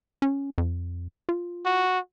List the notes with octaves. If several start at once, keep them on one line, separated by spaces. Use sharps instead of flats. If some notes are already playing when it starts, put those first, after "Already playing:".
C#4
F2
F4
F#4